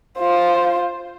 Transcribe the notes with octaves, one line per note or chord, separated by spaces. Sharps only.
F4 C5